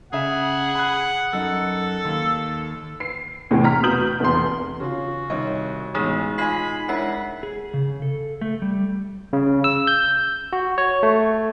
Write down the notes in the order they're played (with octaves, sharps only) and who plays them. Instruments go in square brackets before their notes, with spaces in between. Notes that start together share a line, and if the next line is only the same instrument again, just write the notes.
[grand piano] C#3 E5 [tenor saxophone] G#4 [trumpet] F#5
[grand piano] B5 F#6
[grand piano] F#2 D#4 [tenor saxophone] A4
[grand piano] D#2
[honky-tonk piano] C7
E2 A2 C3
A#5 F6 B6
B2 D#6 G6 F#7
F1 E2 C6
[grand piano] C#3 F4 [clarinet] F#4
[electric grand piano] C2 [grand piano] D#3 C#5 D#5
[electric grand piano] A1 [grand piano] B2 D#6 [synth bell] G#3 D#4 G#4
[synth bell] D#4 G#6 C7 [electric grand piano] F4 D#5 G#5 [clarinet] B5
[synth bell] G#3 B6 C7 [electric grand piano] D4 E4 A#4 [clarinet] F#5
[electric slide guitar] G#4
C#3
A4
A3
G3
[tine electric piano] C#3
E6
G6
F#4
C#5
A3